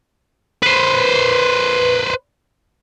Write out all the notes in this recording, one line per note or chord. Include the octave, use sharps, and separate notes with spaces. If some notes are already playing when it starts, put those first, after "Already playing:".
B4 C5